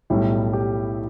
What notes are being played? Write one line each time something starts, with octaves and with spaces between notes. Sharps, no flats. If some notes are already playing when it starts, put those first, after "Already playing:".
B1 A2 G3 E4
G4